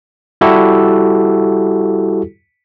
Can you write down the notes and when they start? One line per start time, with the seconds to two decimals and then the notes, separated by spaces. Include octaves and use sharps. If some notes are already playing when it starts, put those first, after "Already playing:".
0.41 G3 E4 F#4 G4 A4